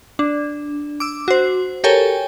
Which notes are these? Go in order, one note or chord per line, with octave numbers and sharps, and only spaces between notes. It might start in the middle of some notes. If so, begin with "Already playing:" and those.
D4
D6 E6
F#4 C5
G4 A4 A#4 C#5 G5 G#5